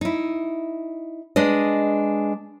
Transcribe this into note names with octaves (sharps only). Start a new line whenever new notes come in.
D#4 E4
G#3 D4 B4 D#5